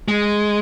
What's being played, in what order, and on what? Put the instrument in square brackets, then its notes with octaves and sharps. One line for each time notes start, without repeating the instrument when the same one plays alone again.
[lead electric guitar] G#3